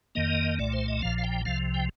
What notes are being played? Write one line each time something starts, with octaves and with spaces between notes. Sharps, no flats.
F2 D#3 A#3 D#5
C2 A#2 A3 D5
C5
D#5
A#1 A#2 F3 F5
F5
G5
C2 C3 F3 F5
G5